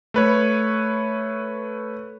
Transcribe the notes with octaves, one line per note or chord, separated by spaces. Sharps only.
A3 B4 C#5